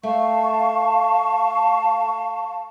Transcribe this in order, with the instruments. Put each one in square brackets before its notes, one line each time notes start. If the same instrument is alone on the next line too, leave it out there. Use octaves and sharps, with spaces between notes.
[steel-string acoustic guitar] A3 [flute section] F5 A5 C#6